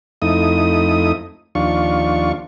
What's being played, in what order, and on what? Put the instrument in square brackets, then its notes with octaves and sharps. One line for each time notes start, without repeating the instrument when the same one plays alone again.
[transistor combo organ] F2 A3 D#4 E4 D#6
D#2 F3 D4 F4 C#6